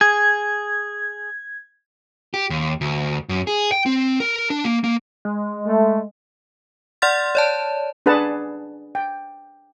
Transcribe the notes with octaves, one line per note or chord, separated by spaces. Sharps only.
G#4 G#6
G4
D#2
D2
F#2
G#4
G5
C4
A#4
D4
A#3
A#3
G#3
A3
D5 F#5 C6 F6 A6
C#5 D5 A5
D4 G#4 B4 F#5 A5
G5